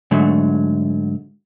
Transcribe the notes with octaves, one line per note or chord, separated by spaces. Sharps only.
G#2 D3 F#3 A3